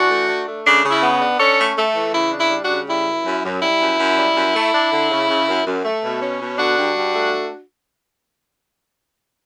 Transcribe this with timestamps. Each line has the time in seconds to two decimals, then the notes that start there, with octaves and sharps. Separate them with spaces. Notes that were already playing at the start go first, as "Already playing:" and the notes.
Already playing: E3 D4 F#4
0.11 A3
0.29 D4
0.47 A3
0.66 C#3 D4
0.84 C#3
0.90 E4
1.03 B3
1.21 D4
1.40 C#4 A4 C#5
1.58 A3
1.77 A3
1.96 E3
2.14 C#3 E4
2.32 D4
2.39 E4
2.51 G3
2.64 D4 F#4
2.70 C#3
2.88 G3 E4
3.07 F#2
3.25 F#2
3.44 F#2
3.62 G3 E4
3.81 F#2
4.00 F#2
4.18 G3
4.36 F#2
4.55 A3
4.74 D4
4.92 D3
5.11 C#3
5.29 C#3
5.48 F#2
5.66 F#2
5.84 A3
6.04 B2
6.22 C#4
6.41 B2
6.58 D3 D4 F#4
6.77 G2
6.96 G2
7.14 A3